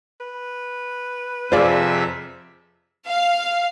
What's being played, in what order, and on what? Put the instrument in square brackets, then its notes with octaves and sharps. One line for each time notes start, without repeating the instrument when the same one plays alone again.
[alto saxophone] B4
[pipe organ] F2 C3 E5 [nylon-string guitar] F4 G#4 [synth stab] C5 D5
[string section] F5